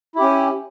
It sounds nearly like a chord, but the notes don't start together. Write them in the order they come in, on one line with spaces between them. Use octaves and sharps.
E4 G4 C#4